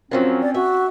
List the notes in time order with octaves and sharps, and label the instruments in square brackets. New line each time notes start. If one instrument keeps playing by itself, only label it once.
[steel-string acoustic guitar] F#2 F3 F#3 [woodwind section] C4 C#4
[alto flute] D5
[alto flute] F#4 [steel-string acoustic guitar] E5